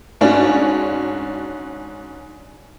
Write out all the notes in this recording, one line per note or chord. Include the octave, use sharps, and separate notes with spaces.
G#2 C#4 D4 F4 F#4